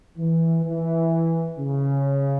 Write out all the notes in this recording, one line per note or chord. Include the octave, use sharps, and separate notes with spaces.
E3
E3
C#3